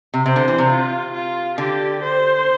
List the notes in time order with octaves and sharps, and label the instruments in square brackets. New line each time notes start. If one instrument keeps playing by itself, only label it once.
[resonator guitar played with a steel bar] C3
[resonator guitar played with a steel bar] C3 [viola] C5
[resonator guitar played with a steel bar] D3
E3
C3
[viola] F4
F4
[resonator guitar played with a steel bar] D3 [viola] G4
[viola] C5